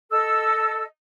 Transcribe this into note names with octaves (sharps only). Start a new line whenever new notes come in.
A4 D#5 E6